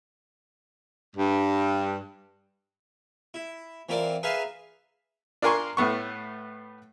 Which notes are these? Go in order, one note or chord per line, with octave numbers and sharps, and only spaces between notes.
G2
E4
E3 C4 F4 A#4 D5
G#4 B4 E5 F5 A#5 C6
D4 F4 A#4 G#5 C6 C#6
A2 A3 B3 C#6